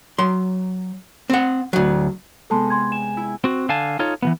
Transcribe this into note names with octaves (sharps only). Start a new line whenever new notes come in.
F#3 C6
C4 F#5
D2 F#3
C3 G#3 B3 A4 A5 C6
G#5 C6 G#6
G#5 E7
E4
C4 F#4
D3 F5 G#5 A5
D#4 F4 A4 C#5
E3 F3 B3